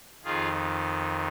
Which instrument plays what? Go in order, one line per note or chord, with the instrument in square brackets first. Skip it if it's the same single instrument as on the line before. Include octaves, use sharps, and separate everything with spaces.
[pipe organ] F2 D#3 F4 G#4